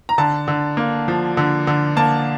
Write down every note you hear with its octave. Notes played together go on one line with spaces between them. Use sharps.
A#5
D3 A5
D3
A#3
F3
D3
D3
A#3 A5